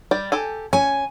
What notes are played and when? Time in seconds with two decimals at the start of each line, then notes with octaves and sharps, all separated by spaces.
0.11 G3 D5 G5
0.32 G4 A4 G#5
0.73 C#4 G#5